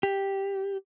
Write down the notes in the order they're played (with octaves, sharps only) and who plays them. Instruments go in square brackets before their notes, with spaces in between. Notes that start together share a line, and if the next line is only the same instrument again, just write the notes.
[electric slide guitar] G4